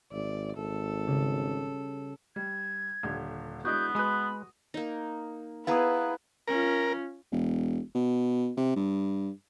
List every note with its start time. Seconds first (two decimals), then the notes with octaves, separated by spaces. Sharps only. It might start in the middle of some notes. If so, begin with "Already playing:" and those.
0.12 G#1 D5 E5
0.57 G#1 A4
1.07 C#3 G3 G4
2.36 G3 G#6
3.03 D#1 D3 G4
3.65 G#3 B3 D4 E4 F#4 D#5 G6
3.95 G#3 F#4 B4 B5 D#6
4.74 A#3 D#4
5.67 B3 E4 G#4 B4 F5 A#5 D#6
6.48 C#4 F4 A#4
7.32 E1
7.95 B2
8.57 C3
8.76 G2